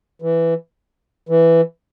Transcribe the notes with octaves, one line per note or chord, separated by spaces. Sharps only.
E3
E3